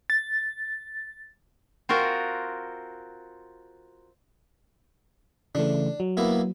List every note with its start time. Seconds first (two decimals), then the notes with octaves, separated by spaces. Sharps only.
0.10 A6
1.89 C4 F4 F#4 A#4
5.55 C#3 E3 A3 D4
6.00 F#3
6.17 A#3 B3 E4